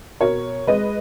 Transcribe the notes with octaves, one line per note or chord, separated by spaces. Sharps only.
B2 A#4 C#5
G#3 B4 D#5